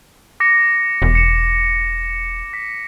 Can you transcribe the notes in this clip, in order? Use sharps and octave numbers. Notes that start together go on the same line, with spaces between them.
D6 A#6 C#7
E1
C#7 E7
B6